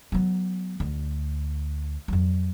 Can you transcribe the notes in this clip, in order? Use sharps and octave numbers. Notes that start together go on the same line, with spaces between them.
F#3 B3
D2
F2 F#3